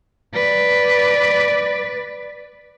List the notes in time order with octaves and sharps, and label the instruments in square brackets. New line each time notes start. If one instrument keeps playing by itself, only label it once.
[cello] B4 D5